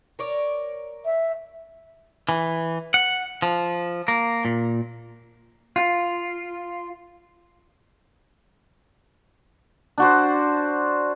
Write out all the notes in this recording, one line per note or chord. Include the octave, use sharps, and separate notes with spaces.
A#4 C#5 D5
E5
E3
F#5
F3
A#3
A#2
F4
D4 F#4 C5